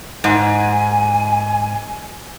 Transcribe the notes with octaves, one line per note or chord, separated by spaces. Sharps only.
G#2 G#5